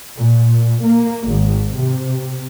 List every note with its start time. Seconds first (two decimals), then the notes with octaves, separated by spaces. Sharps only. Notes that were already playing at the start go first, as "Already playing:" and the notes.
0.17 A#2
0.82 A#3
1.29 G#1
1.77 C3